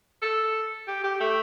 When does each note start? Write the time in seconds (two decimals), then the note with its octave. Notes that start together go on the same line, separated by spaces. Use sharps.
0.22 A4
0.88 G4
1.04 G4
1.20 A3